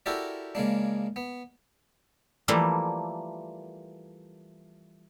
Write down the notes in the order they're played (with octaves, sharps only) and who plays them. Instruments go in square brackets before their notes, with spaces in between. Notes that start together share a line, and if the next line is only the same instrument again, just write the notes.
[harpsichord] E4 F#4 G4 A4 A#4 D5
C#3 G#3 A#3 D4
B3
[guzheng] E3 F3 G3 A3 A#3